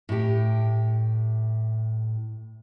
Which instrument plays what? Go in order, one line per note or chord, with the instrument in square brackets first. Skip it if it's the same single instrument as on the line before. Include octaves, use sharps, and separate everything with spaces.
[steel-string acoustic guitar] A2 G4